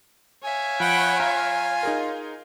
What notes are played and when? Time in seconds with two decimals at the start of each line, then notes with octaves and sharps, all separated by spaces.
0.44 C#5 E5 F5 G#5
0.80 F3 F#5 G5 B5
1.20 F4 A#5 F6 F#6
1.83 D#4 G#4 A#4